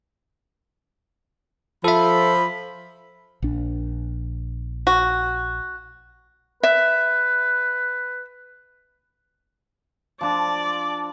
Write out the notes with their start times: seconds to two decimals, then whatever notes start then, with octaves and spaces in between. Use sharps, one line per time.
1.84 F3 A4 E5 B5
3.42 A#1 D4
4.87 F#4
6.63 B4 E5
10.21 F3 D4 D5